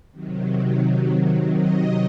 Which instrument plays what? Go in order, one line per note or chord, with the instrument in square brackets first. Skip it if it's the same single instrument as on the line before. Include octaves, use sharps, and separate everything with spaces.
[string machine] C3 D#3 F#3
D#5